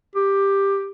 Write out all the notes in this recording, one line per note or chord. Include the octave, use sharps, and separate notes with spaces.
G4